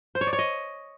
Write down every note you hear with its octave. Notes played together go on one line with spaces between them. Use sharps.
C5
C#5
D5
C#5
D#5